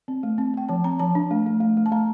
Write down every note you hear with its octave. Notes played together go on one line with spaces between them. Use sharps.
C4
A3
C4
C4 G5
F3 A5
C4 A#5
F3 A5
D4
A3
A3
A3
A3
A5
A3 A#5